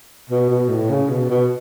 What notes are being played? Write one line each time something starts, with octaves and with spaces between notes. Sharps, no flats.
B2
B2
A2
C#3
B2
B2